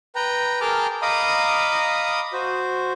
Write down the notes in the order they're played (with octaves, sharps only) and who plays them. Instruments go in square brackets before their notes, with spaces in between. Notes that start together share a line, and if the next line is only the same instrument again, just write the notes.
[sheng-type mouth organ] B4 G5 A#5
G#4 A#4 G5 A5 D6 F6
D#5 F5 A#5 B5 D6 D#6
F#4 C5